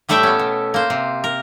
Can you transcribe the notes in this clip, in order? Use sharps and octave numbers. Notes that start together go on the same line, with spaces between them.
A2 G3 A3 A4 E5 G5
B3 C#4
B2
A#3 C5
C3
A#4